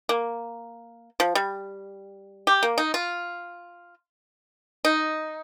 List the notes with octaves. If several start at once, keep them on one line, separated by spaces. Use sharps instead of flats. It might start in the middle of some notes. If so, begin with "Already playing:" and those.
A#3
F3
G3
G4
A#3
D#4
F4
D#4